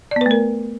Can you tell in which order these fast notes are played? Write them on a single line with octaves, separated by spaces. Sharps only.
D5 B3 B4 A3 A#4